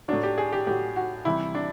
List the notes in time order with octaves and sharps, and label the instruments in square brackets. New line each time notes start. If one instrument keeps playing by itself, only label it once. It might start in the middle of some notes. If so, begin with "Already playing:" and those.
[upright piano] A2 F#3 D4
G4
G#4
G4
A2 F#3 G4
F#4
C3 E3 G3 E4
D4